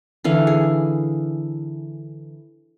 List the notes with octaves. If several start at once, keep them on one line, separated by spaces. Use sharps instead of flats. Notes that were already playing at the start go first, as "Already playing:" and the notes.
D3 E3 F5
G#4